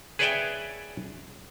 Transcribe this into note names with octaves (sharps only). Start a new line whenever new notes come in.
G#4 B4 C#5 D5 E5 G5